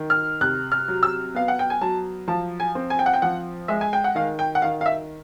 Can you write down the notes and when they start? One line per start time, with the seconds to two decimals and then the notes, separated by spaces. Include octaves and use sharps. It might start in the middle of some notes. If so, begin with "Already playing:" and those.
Already playing: D#3
0.10 F6
0.41 C3 F#6
0.72 F6
0.88 F#3
1.03 E6
1.35 B3 F5
1.48 F#5
1.59 G5
1.70 G#5
1.81 F#3 A5
2.28 F3 A5
2.60 G#5
2.75 C4
2.90 G#5
2.99 G5
3.06 F#5
3.14 G5
3.22 F3 F#5
3.68 G#3 E5
3.81 G#5
3.93 G5
4.04 F#5
4.15 D#3 F5
4.39 G5
4.55 F#5
4.62 D#3 F5
4.81 F5
4.86 E5